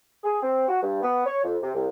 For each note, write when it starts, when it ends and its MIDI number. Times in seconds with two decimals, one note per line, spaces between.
0.24 0.42 68
0.43 0.66 60
0.69 0.81 66
0.82 1.00 43
1.02 1.22 59
1.26 1.39 73
1.44 1.57 41
1.62 1.74 48
1.74 1.87 36